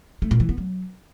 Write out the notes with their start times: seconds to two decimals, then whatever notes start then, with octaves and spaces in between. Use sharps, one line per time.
0.22 A3
0.31 A#2
0.40 E3
0.49 B3
0.58 F#3